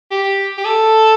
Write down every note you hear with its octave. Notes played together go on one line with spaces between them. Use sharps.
G4
G4
A4